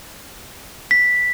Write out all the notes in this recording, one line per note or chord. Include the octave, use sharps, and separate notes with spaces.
B6